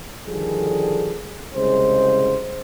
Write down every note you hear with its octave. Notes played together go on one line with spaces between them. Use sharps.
D3 D#3 F3 G3 G#4 A4
C2 C#3 G#3 C5